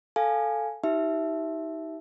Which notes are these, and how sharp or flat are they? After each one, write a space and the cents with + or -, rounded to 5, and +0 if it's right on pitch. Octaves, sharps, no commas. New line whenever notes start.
A4 +0 F5 +0 G#5 +0
D#4 +30 G4 -25 E5 +0